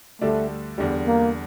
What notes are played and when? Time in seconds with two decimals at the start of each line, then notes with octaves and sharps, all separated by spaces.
0.21 D2 D3 G3 A3 D4
0.78 E2 D3 G3
1.06 A#3